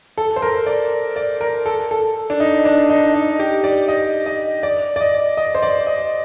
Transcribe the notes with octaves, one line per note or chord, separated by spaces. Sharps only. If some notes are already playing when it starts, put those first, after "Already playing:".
A4
C5
A#4
D5
D5
A#4
A4
A4
D4
D#4
D4
D#4
D#4
G4
D5
D#5
D#5
D5
D5
D#5
D#5
C5
D5
D#5